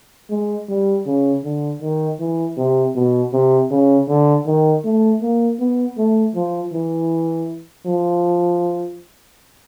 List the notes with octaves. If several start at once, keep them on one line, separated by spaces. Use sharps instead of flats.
G#3
G3
C#3
D3
D#3
E3
C3
B2
C3
C#3
D3
D#3
A3
A#3
B3
A3
F3
E3
F3